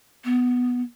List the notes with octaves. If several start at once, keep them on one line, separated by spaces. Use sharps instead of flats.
B3